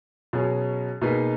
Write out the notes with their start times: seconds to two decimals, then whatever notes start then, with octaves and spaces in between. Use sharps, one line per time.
0.33 B2 F#3 C#4 G#4
1.02 B2 A#3 D#4 G#4 B4